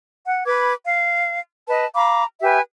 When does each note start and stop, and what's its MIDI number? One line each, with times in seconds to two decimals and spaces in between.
0.24 0.43 78
0.45 0.73 71
0.45 0.73 83
0.45 0.73 86
0.45 0.73 92
0.85 1.37 77
1.68 1.85 71
1.68 1.85 75
1.68 1.85 81
1.95 2.23 77
1.95 2.23 82
1.95 2.23 83
1.95 2.23 86
2.42 2.59 67
2.42 2.59 71
2.42 2.59 76
2.42 2.59 80